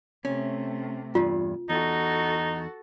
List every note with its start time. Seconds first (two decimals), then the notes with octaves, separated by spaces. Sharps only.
0.25 C3 A3 C#4
1.15 E2 G2 F4
1.69 E2 D#4 F#4 A4